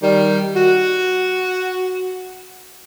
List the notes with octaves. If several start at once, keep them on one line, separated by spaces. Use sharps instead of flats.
D#3 G3
F#4